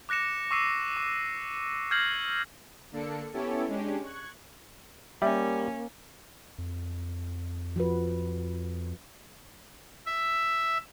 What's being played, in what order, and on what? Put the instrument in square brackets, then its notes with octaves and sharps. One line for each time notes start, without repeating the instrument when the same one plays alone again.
[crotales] D6 F#6 A#6 C#7 E7
C#6 D6 E6 C7 D#7
D6
F6 G6 G#6 A#6 C7 F#7
[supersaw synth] D3 A#3 D4 A4 C#7
B3 C#4 E4 G4 A4 C#5
G#3 C#4 D4 G4
C#6 F#6 G#6
[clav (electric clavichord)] G3 [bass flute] A#3 [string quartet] C#4 [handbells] E5
[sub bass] F2
[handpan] F3 F#4 B4
[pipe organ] E5